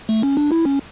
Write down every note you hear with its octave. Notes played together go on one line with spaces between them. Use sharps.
A3
C#4
D4
E4
C#4